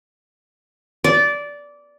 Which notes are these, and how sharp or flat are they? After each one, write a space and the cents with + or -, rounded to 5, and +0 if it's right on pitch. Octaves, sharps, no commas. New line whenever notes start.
D5 -15